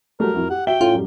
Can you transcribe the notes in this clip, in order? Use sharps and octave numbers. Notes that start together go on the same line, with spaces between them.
F#3 G3 A3 A#4
F2 E4 F#4
G4 F#5
F#4 E5 G5 G7
A2 C#4 F4 A4
F#2 G3